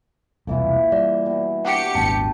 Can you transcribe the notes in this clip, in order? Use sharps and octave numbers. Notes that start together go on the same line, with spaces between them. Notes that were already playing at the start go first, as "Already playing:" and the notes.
E1 C2 A#2 E3 E4
G3 D5
B2 E3
D4 G4 F#5 C#6 D6 C#7
D#1 G#1 B3 G5 A5